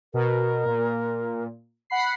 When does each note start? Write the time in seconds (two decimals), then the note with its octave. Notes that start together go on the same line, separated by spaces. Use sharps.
0.14 B2 A#4
0.65 A#2
1.90 F#5 B5 C7